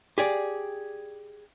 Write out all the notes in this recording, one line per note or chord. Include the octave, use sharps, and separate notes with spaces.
G4 G#4 D5